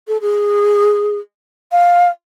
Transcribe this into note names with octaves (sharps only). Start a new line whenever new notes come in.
A4
G#4
F5